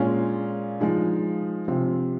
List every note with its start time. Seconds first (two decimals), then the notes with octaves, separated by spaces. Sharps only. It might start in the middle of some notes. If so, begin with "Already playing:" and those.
Already playing: A#2 G#3 C#4 F4
0.80 F3 G#3 D#4
1.68 C3 F3 C4